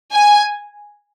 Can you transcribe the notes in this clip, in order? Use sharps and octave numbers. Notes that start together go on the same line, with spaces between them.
G#5